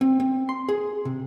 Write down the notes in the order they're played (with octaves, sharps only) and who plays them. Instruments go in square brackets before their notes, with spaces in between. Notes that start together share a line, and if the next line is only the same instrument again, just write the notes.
[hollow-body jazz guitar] C4
C4
C6
G#4
C3